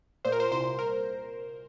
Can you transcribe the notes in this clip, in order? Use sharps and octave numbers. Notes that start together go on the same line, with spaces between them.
A#2 C5
A#4
C5
C2 C5
A#4